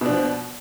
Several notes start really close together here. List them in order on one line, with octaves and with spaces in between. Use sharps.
B2 D4 F3